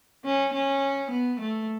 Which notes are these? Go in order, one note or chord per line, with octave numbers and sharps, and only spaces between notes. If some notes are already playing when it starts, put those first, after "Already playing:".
C#4
C#4
B3
A3